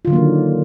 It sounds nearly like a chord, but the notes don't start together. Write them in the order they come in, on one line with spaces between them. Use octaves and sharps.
F4 D3 F#3 A#3 D#3